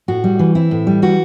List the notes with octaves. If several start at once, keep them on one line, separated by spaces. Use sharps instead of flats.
A2 F#4
G3
E3
C4 E4
A2
G3
E3 F#4